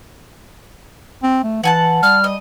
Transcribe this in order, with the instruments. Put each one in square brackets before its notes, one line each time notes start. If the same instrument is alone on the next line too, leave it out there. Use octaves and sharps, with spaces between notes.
[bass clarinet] C4
A3
[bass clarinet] E3 [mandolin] F#5 G#5 A5
[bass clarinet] G3 [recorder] F6
[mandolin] D#5